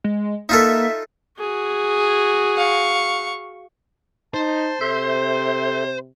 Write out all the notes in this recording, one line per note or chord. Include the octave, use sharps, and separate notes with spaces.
G#3
A#3 D#4 F4 A4 E5
F#4 G#4
F5 C#6
D#4 C5 A5
C3 A4 E5 C6 G6